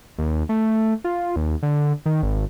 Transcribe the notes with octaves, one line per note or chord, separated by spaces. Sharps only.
D#2
A3
F4
D#2
D3
D#3
G#1